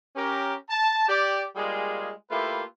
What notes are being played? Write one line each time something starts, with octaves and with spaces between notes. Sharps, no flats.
C#4 G4 A#4
A5
G4 D5
G3 G#3 A#3 F4 G#4
A3 A#3 E4 F4 G4 B4